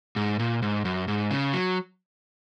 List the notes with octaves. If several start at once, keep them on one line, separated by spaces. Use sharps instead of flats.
G#2
A#2
G#2
F#2
G#2
C#3
F#3